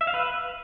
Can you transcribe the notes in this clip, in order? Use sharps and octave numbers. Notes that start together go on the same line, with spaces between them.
E5
F5
B4